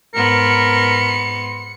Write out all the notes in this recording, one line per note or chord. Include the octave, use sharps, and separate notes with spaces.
G#2 B3 A#4 C6 C#7